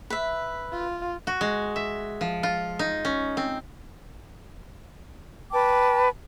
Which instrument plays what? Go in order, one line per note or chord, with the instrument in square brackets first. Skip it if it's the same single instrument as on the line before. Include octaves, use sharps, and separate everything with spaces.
[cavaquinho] B4 E5
[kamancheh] F4
[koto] F#4
G#3
E5
F3
F4
D#4
C#4
C4
[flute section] B4 G5 A5 D6